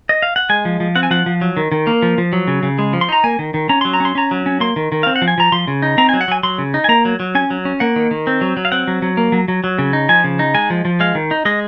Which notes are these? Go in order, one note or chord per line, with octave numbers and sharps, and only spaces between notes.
D#5
F5
F#5
G#3 G#5
F3
F3
C4 F#5
G#5
F3 F#5
F3
F#3
D#3
D#3
A#3
F3
F3
F#3
C#3
C#3
G#3
F3
C6
D#4 A#5
A#3 G#5
D#3
D#3
C#4 A#5
F#3 C6
A#5
C#4 C6
C#4 A#5
F#3
C#4
A#3 C6
D#3
D#3
C4 F5
F#5
F3
G#5
F3 A#5
F3 C6
C#3
D#4
C4 A#5
F#3 G#5
F#5
F#3 G#5
F#3 C6
C#3
D#4
G#5
A#3 A#5
F#3
F#3
C#4 G#5
F#3
C#4
A#3 F#5
D#3
D#3
C4
F#3
F#3
F5
C4 F#5
F#3
F#3
A#3
F#3
F#3
F#3
C#3
D#4
F3 G#5
C#3
D#4
G#3 G#5
F3
F3
G#3 F5
D#3
D#4
G#3 D#5